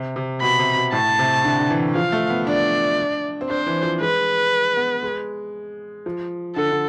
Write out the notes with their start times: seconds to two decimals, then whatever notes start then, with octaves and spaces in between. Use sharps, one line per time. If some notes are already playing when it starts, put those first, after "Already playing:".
Already playing: C3
0.16 C3
0.42 B2 B5
0.59 C3
0.76 B2
0.92 A2 A5
1.19 C3
1.45 D3
1.59 D3
1.70 E3
1.95 F3 F5
2.12 A3
2.29 B3
2.47 D4 D5
3.41 C4
3.50 D4 C5
3.66 E3
3.83 F3
4.01 G#3 B4
4.77 B3
5.02 G#3
6.06 F3
6.56 D3 A4
6.71 D3